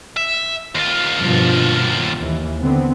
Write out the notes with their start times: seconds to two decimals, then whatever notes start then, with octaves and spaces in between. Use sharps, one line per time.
0.16 E5
0.75 D#2 F4
1.18 G2 B2 F3
2.18 D#2 E3
2.61 D3 B3 C4